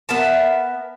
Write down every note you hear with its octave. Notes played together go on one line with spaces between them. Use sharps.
B3 A#4 E5 A5